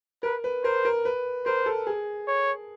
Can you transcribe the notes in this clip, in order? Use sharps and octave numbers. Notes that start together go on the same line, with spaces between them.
A#4 B4
B4
A#4 C5
A#4
B4
A#4 C5
A4
G#4
C#5